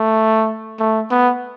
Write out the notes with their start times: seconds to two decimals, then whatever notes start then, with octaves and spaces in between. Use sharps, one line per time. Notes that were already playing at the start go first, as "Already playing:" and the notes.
Already playing: A3
0.80 A3
1.11 B3